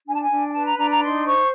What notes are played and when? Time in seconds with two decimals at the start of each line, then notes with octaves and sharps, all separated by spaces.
0.07 D4 G#5
0.14 A5
0.21 G#5
0.30 D4
0.48 G#5
0.54 B4 A5
0.65 A#5
0.77 D4 A#5
0.89 A#5
1.01 D#4 C6
1.25 C5 C#6